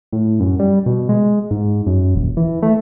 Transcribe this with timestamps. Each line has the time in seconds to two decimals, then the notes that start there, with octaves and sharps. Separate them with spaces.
0.13 A2
0.40 F#2
0.59 G3
0.86 B2
1.09 G#3
1.51 G#2
1.87 F#2
2.15 D#1
2.37 E3
2.62 A3